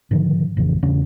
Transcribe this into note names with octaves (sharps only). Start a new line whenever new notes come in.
G#2 D3 D#3 F3
A1 F2 C#3 E3
E2 C#3 G3 D4